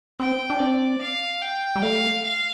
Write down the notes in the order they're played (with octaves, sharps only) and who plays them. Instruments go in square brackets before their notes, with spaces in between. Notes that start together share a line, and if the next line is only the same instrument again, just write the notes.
[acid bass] C4 [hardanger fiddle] G5
[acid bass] D4
[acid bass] C4 [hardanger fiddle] D5
[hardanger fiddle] F5
G5
[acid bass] G3
[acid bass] A3 [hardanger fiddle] F5
[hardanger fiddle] F5